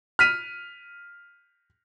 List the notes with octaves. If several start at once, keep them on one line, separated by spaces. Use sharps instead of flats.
F6 B6 D#7